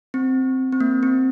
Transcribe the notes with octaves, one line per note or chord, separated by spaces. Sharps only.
C4
C4
A#3
C4